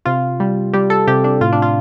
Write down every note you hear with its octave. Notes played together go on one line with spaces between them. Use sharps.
C3 F4
G3
G3 G4
A4
C3 G4
D4
A2 F4
D4
F4